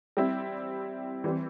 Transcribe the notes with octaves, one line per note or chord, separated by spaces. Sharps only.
G3 C4 E4
E3 G3 C4